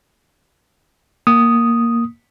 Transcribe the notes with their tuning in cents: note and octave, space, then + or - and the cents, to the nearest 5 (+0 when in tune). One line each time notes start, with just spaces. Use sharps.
A#3 +0 D#6 +0